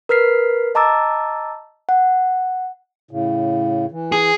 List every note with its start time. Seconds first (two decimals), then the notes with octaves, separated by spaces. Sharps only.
0.09 A#4 B4 F6 B6 C7
0.75 D#5 A5 A#5 D6 E6 A6
1.89 F#5
3.11 A2 C#3
3.92 E3
4.12 G#4